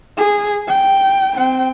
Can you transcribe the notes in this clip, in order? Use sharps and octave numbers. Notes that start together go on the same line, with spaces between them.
G#4
G5
C4 G5